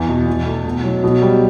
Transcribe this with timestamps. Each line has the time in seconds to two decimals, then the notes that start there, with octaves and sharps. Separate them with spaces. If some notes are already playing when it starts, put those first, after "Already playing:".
Already playing: E2
0.09 B2
0.27 B2
0.46 A3
0.66 B2
0.84 F#3
1.04 B2
1.22 G3